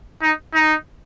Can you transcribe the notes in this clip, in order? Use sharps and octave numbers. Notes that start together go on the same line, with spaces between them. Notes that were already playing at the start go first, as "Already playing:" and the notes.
D#4
D#4